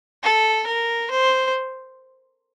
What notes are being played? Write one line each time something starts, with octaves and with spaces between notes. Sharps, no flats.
A4
A#4
C5